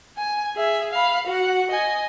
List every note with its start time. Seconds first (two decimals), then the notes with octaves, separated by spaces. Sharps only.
0.17 G#5
0.56 G#4 E5
0.91 F5 B5
1.27 F#4 F#5
1.70 D#5 G#5